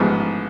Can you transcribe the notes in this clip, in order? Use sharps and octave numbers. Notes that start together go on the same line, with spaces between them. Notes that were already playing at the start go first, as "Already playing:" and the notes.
Already playing: A1 G#2 F3 B3